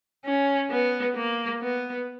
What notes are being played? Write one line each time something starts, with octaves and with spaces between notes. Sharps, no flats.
C#4
B3
A#3
B3